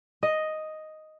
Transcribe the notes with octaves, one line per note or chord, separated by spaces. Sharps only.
D#5